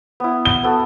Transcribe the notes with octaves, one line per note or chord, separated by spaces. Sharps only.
B3 E4
G7
B3 F#4 A4